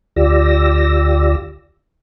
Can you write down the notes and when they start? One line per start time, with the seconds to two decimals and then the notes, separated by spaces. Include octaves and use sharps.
0.16 D2 F4 G4 D5 E6 A#6